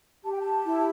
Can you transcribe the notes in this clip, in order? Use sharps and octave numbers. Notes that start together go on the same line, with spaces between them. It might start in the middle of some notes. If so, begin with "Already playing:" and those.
G4 A5
G5
A5
E4